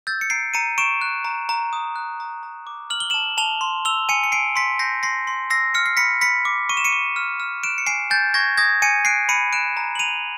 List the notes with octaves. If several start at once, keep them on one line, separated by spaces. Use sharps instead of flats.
E6 G6 A6
C#7
A#5 C7 D7
A#5 C#7 D#7
C#6 D7 E7
F#6
A#5
A#5
D#6
F#6
A#5
A#5
D6
F6 F#7
G7
A5 E7 F#7
A5 F7 G7
C6
E6 F7 G7
G#5 C#7 D#7
C#7
G#5 C7 D7
C6 B6 C#7
G6 A#6 C7
C6 A#6 C7
C6
E6 A#6 C7
F6 C#7
C7
B5 B6 C#7
B5 B6 C#7
D6
C#6 D#7
E7
C#7 D#7
C#6
F6
F6
F#6 D7 E7
C#7
G#5 C7 D7
G#5 G6 A6
C#6 G#6 A#6
D#6 G#6 A#6
G#5 C#7 D#7
F#6 C7 D7
B5 C#7 D#7
F#6 D7 E7
A#5
F#7
A#5 D#7 F7